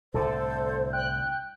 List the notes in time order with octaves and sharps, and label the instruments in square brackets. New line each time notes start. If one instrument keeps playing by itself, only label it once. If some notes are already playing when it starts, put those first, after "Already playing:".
[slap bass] C2 A2 D3 [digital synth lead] A4 [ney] C5
[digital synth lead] G5 [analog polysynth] F#6